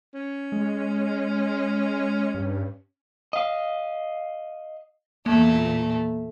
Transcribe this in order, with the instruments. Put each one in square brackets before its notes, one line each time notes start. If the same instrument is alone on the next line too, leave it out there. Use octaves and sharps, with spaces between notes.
[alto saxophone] C#4
[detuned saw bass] G#3
G2
[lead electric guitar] D#5 F5
[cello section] E2 A#2 [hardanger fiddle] A3 [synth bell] A#3